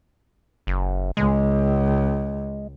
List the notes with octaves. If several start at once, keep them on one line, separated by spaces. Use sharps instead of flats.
F#1
C#2 G#3